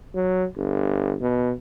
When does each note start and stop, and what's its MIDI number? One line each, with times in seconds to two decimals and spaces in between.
0.15 0.46 54
0.57 1.15 31
1.22 1.53 47